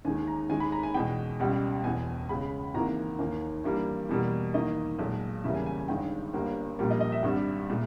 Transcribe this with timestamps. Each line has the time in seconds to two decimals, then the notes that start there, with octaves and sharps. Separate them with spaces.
0.05 D#2 D#3 G#3 G#5
0.27 A#5
0.49 D#2 D#3 G#3 G#5
0.60 B5
0.72 A#5
0.83 G#5
0.94 E2 B2 G#3 G5
1.40 C#2 B2 G3
1.84 E1 E2 B2 G#5
2.29 C#2 C#3 G#3 B5
2.74 G#1 G#2 E3 A#3 A#5
3.19 D#2 D#3 A#3
3.64 G2 E3 G3 A#3
4.09 E2 B2 G3 A#3
4.54 E2 D#3 A#3 D#5
4.98 B1 A#2 G#3
5.44 E2 C#3 G3 A#3 E5
5.55 G#5
5.66 G#5
5.77 G#5
5.88 G1 G2 D#3 G#3 G5
6.33 G1 G2 G3 A#3
6.79 A#1 A#2 G3 A#3
6.90 D#5
7.00 D#5
7.12 E5
7.23 G#1 G2 G3
7.70 A#2 G#3